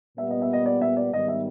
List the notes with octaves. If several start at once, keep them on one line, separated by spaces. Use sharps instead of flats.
A#2 G3 B3 E5
D#5
E5
D#5
D5
E5
D5
G#2 D#3 G3 B3 D#5
E5